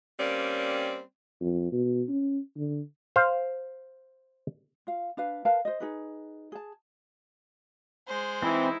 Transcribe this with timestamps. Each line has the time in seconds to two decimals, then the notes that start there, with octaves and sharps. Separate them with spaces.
0.19 G3 A#3 C4 C#4 D5
1.41 F2
1.72 B2
2.08 C#4
2.57 D3
3.16 C5 F5
4.87 F4 F5
5.17 D4 B4 F5
5.45 A#4 B4 F5 A5
5.65 C5 D#5
5.80 D#4 G#4 B4
6.52 G#4 A5
8.07 G#3 C5
8.43 E3 C4 D#4 E4